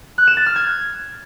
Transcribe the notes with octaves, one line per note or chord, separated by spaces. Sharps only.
F#6
E7
A6
F6
G#6